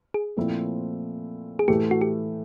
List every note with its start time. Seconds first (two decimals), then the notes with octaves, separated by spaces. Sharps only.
0.14 G#4
0.37 A#2 F3 A3 C4 E4
1.59 G#4
1.68 A2 E3 A3 G4
1.91 F#4
2.01 G4